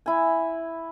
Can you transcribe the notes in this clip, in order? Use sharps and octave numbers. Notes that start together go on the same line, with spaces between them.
E4 G#5